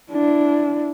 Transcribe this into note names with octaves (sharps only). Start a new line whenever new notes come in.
D4 E4